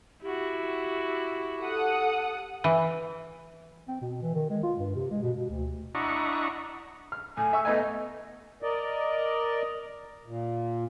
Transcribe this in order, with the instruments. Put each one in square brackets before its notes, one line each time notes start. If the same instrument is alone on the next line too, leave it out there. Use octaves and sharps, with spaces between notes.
[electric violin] E4 F#4 [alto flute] G4
[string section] A4 F#5 D#6
[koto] E3
[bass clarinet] C4
B2
E3
D#3
G#3
F4
G2
C3
G#3
B2
B2
D2
[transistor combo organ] D4 E4 D#5 F#5 A#5 C#6
[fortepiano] F6
[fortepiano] A2 [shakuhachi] G#5
[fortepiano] E5 C#6 E6
[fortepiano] A3 B3 G#5 [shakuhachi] D#5
[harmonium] A#4 D5 D#5
A#2